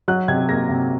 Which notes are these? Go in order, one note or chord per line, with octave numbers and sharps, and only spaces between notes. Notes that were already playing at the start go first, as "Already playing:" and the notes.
F#3 F#6
C3 G#6
A#3 A#6
C3